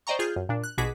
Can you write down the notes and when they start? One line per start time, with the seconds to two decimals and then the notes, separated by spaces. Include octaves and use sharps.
0.07 C5 D5 D#5 G5 A#5 C#6
0.19 F4 G#4 F6 G6
0.36 F#2
0.49 A#2 D4
0.64 F#6
0.78 A#1 B2 F#4 G#4 D6 B6